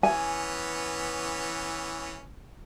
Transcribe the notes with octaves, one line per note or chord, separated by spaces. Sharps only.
E3 B3 C#4 G#5